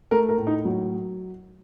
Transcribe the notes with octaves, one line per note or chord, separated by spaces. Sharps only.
A3 A#4
A#4
A2
D#4
F#3